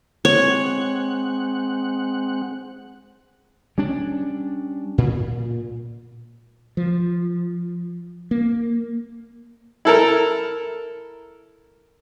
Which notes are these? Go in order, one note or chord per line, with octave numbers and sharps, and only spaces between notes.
G#3 C4 C#5 F#5
G3 C#4 D4
A#2
F3
A#3
E4 A4 A#4